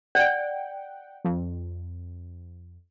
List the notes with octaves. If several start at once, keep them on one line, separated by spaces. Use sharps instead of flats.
D5 F#5 G5
F2